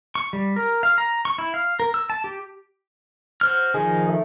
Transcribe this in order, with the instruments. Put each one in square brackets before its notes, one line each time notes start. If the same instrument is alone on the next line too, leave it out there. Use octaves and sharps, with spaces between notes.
[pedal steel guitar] C#6
G3
A#4
F5
A#5
C#6
E4
F5
A#4
E6
A5
G4
F#4 C5 F6
[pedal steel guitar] D#3 F3 D#4 [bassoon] G#4
[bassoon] A3